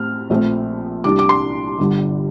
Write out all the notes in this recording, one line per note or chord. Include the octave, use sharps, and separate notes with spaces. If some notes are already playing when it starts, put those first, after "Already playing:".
Already playing: A2 C4 F6
A#1 A#2 F3 A3 C4
C2 C3 G3 D4 D6
D6
C6
G1 G2 D3 G3